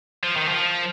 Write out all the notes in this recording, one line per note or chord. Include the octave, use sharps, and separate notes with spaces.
F3
D#3
F3